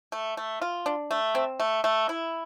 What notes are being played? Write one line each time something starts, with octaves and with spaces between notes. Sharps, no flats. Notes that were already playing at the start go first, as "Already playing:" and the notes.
A3
A3
F4
D4
A3
C4
A3
A3
E4